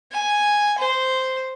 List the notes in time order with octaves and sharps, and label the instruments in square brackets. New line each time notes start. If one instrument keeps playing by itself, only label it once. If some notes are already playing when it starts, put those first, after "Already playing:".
[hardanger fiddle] G#5
C5